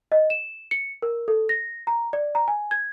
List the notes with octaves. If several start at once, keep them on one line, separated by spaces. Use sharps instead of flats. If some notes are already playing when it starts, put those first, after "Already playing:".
D#5
E7
C#7
A#4
A4
A#6
A#5
D5
A#5
G#5
G#6